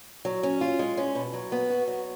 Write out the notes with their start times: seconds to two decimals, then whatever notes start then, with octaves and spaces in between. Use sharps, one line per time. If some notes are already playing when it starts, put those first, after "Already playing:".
0.25 F#3
0.43 C#4
0.61 F4
0.79 G#3
0.97 C#4
1.15 B2
1.33 F#3
1.52 B3
1.70 F#4
1.88 F#3